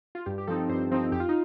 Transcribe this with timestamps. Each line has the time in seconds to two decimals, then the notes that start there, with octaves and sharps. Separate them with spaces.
0.15 F4
0.26 G2 G4
0.38 G4
0.47 F3 C4 D#4 A4
0.69 G2 C5
0.91 F3 C4 D#4
1.12 F2 G4
1.20 F4
1.29 D#4